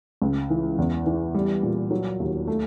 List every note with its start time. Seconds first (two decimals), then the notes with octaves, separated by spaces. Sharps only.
0.22 C#2
0.50 E3
0.78 E2
1.06 E3
1.35 G3
1.63 A#2
1.91 F#3
2.20 D#2
2.47 A3